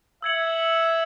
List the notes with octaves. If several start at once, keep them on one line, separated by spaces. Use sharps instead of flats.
E5 E6 G#6 C#7 F#7